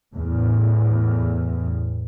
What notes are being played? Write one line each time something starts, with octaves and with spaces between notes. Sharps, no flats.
E2 A2